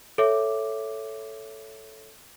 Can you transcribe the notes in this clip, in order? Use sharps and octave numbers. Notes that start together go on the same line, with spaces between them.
A4 C#5 E5 D6